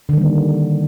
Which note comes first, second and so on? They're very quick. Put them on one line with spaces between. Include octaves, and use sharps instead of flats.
D3 D#3 G3 A#3